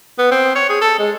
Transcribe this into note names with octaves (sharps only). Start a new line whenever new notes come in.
B3
C4
C#5
G#4
A4
G#3